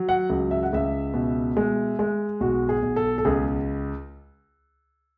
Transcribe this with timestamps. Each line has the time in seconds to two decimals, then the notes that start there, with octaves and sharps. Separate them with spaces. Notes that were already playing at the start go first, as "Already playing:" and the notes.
Already playing: F#3
0.09 F#5
0.30 C#2
0.51 E5
0.63 F#5
0.73 C#2 E5
1.14 B2
1.57 G#3
1.99 G#3
2.40 B1 F#4
2.69 G#4
2.82 B1
2.96 A4
3.18 A4
3.25 C#2 G#4